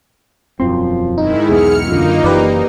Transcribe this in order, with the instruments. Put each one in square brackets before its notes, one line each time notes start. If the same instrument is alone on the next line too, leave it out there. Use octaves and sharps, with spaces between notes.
[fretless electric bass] E1 F#2 C4 [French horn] F3 [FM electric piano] C6
[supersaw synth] G#2 D#3 E4 [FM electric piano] D#4
[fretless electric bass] B1 E2 B3 [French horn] G#4 [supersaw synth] F6 C#7
[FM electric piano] F#2 D3 [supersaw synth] A#3 D#4 [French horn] F4
[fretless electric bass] F#1 F#2 E3 [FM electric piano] G4 B4 D5